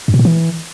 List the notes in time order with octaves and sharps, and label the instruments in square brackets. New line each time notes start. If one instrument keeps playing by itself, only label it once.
[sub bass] G2
B2
A#2
E3